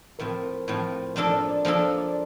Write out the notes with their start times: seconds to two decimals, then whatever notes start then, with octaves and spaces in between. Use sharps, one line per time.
0.19 A2 F3 C4 A#4
0.68 A2 F3 C4
1.16 F3 A#3 D4 A4 C5
1.33 D5
1.49 D5
1.65 F3 A#3 D4 A4 C5
1.80 C5
1.97 D5